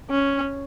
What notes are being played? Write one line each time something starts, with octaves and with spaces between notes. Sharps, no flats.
C#4